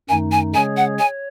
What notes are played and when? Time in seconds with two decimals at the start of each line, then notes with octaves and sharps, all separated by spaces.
0.09 F#2 D#3 A3 D#4 G#5
0.32 G#5
0.54 C#3 G#3 C#4 G#4 C#5 G#5
0.77 F#5
0.99 C#5 G#5